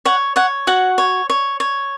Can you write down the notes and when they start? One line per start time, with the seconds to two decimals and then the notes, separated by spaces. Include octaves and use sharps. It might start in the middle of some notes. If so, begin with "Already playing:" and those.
0.05 C#5 F#5
0.36 C#5 F#5
0.67 F#4 F#5
0.98 C#5
1.30 C#5
1.60 C#5